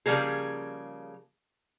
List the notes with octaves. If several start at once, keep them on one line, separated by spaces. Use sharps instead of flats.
C#3 F3 G3 A#3 G#4